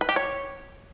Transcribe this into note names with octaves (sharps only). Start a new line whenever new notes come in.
B4
G4
C#5